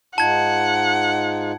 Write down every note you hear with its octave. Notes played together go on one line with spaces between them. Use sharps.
G#2 D#4 F4 F#5 A5 G#6